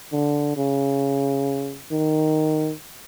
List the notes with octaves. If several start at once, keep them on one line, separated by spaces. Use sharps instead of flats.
D3
C#3
D#3